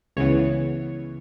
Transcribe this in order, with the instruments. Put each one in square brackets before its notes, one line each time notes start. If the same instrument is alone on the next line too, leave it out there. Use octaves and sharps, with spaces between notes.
[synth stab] C#2 C#3 E3 B3 C#5